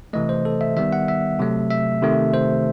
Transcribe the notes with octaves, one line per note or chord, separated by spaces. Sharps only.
C3 E3 A3 D#5
C5
A4
E5
D#3 G3 B3 E5
F#5
E5
C3 F#3 A3
E5
C3 D#3 A3
C5